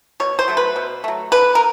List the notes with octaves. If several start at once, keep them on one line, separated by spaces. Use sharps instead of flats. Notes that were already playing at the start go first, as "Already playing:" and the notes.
B2 C#5
C5
F#3 A3
B4
B2
F#3 A3
D3 B4
A#4